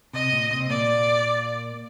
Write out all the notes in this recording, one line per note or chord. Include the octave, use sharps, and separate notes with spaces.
C3 D#5
A#2
C3
C4
A#2 A#3 D5